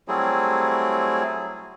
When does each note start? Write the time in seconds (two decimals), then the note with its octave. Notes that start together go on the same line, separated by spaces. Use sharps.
0.08 F#3 G3 A3 C4 E4 G#4